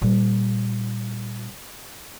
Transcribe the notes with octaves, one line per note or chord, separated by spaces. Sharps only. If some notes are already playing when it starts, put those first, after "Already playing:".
A#2 G3